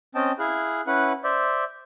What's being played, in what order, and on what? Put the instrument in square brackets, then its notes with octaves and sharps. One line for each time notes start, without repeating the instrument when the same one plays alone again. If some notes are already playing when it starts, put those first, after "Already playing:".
[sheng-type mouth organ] C4 C#4 D#5 G5 A5
E4 G#4 F5 F#6
C#4 E4 B4 F#5 F#6
C5 D5 E5